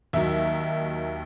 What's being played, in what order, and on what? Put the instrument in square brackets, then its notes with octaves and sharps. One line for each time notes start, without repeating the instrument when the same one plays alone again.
[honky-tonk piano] D#2 D#3 F#3 E5